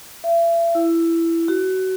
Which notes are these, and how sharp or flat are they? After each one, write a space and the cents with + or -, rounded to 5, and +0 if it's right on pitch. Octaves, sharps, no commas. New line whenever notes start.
E5 +40
E4 +15
F#4 +25